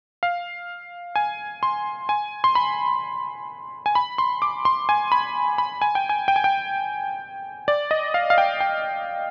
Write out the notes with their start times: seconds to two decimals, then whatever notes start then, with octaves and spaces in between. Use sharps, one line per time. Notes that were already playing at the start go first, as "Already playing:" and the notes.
0.23 F5
1.16 G#5
1.63 C6
2.09 G#5
2.44 C6
2.55 B5
3.86 G#5
3.95 B5
4.18 C6
4.42 D6
4.65 C6
4.89 G#5
5.12 B5
5.58 B5
5.82 G#5
5.95 G5
6.09 G#5
6.28 G5
6.36 G#5
6.44 G5
7.68 D5
7.91 D#5
8.14 F5
8.30 F5
8.38 G5
8.60 G5